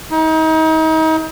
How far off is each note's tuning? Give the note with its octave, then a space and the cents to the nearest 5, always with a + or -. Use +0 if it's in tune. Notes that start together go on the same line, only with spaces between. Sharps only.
D#4 +35